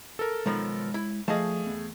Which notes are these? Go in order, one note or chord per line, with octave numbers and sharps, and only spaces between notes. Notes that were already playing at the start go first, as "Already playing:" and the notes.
A4 A#4
B1 D#3 F3 G#3 C#5 B5
E4
F3 A3 G#4 D#5 F5 A5
E2 B3